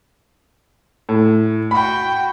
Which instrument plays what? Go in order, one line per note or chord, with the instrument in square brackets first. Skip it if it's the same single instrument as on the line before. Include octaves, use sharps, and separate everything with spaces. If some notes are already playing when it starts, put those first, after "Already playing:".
[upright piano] A2
[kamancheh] F#4 G5 [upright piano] B5